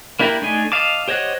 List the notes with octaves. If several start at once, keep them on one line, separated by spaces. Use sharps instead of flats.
A#3 D4 E4 G4 A#4
A3 D4 D#4 G#5
D#5 F5 A5 D6
G4 C5 C#5 D#5 F#5